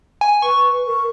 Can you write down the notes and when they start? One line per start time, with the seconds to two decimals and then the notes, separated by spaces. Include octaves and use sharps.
0.21 G#5
0.42 B4 C#6
0.87 A#4